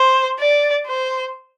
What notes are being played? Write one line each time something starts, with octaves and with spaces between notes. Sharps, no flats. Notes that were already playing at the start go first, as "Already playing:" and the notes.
Already playing: C5
D5
C5